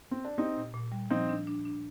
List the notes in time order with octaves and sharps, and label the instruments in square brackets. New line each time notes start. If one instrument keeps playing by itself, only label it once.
[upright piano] C4
D4
[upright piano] C4 D#4 [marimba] G4
[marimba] A#2
A#2
G3
[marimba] F3 [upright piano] C4 D#4
[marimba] D4
D4
D4